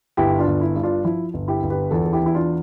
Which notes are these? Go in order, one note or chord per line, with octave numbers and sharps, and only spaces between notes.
G1 E4 G4
D4 F4
G1
E4
G2
D4 F4
F3 E4
G1
E4 G4
G1
G4 B4
E2 F4 A4
A4
E4 G4
E2
E4
D4 F4